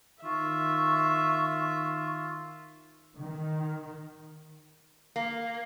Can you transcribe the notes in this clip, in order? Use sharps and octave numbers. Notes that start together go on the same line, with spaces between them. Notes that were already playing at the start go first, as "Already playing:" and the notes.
D#3 F4 E5 C#6
D#3
A#3